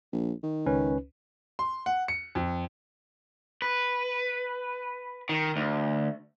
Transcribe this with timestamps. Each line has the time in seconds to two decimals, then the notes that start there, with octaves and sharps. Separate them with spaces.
0.13 A#1
0.43 D#3
0.66 C#2 C#4 B4
1.59 C6
1.86 F#5
2.08 C#7
2.35 F2
3.62 B4
5.29 D#3
5.56 D2